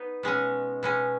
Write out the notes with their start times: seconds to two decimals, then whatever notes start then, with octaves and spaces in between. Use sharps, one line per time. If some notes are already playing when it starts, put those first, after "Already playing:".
Already playing: B3 D#4
0.23 B2 G#3 C#4
0.83 B2 G#3 C#4